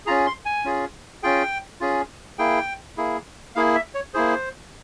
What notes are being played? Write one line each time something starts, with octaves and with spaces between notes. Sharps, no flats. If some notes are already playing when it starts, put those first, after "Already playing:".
C#4 F4 G#4 A#5
C6
G#5
C#4 F4 G#4
C#4 F4 G#4 G5
C#4 F4 G#4
A#3 E4 G#4 G5
A#3 E4 G#4
A#3 E4 G#4 F5
E5
C#5
A#3 E4 G#4 C5